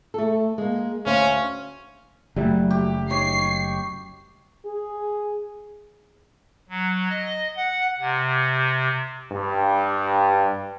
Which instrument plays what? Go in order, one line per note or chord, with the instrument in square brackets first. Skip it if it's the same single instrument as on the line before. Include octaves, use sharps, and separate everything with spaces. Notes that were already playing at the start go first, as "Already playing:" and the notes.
[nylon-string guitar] A3 A4
G#3 A#3
[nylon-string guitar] D2 C5 F5 [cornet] C#4
[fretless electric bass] F#1 G3 [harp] E3 F#3 A3
[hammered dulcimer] G4
[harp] D#4 [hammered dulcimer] C#5 [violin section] C7
[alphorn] G#4
[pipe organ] F#3
D#5
F#5
C3
[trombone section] G2